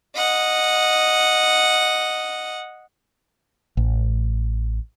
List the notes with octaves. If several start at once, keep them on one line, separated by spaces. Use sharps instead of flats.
D#5 F#5
A1